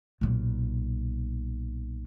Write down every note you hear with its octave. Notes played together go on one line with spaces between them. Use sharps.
B1 A#2